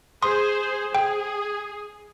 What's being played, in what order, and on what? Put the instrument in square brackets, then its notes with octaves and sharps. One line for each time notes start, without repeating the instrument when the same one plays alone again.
[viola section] G#4 C5 [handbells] C6 D#6
[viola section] G#4 [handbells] G5